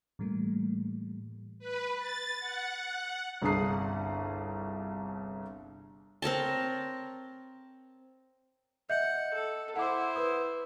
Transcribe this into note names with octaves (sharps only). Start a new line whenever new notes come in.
A2 E3 G3 A3 A#3
B4
A6
F#5
G1 C2 D4 G#4 D#6 C7
C4 A#4 C#5 A5
D#5 E5 F#5 G6
A4
E4 C5 F#5 D6
B4 D#6